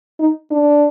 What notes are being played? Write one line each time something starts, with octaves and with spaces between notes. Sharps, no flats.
D#4
D4